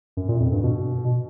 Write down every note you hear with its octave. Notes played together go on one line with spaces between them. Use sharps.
F#2
A#2
F2
G2
B2